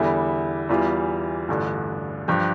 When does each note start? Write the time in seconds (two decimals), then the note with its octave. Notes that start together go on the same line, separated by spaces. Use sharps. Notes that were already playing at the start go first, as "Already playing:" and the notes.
Already playing: E2 D3 G3 E4
0.69 E2 E3 G3 F4
1.48 A1 G2 D3
2.28 G2 F3 G4